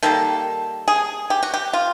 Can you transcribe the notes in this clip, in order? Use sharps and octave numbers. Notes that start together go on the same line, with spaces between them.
D#3 G3 A#3 A4
G#4
G4
F#4
G4
F4